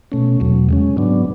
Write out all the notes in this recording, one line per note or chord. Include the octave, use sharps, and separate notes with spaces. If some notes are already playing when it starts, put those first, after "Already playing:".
B2 A3 C#4
E2 B2 F#3
C#3 G#3 C#4
G#2 F#3 B3 D4